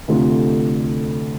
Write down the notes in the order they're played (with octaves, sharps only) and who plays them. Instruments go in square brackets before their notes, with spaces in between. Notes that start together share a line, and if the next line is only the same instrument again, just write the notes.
[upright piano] D2 C3 A3 F4